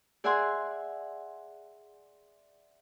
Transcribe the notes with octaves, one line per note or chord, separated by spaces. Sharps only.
G#4 D5 E5 F#5 G#5 C6